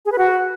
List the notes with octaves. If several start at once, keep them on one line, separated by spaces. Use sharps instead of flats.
G#4
B4
F#4